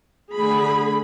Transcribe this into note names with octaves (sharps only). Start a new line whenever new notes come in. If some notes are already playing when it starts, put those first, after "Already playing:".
D3 A3 G#4 B5